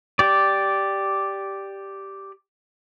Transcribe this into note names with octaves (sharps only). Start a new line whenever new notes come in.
G4 D5